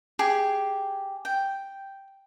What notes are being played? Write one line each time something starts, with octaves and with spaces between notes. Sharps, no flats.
G4 G#4
G5